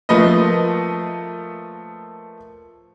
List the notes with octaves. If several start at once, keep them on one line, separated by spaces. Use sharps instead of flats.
F3 A3 A#3 B4 D#5